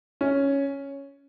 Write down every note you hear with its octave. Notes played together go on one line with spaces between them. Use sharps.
C#4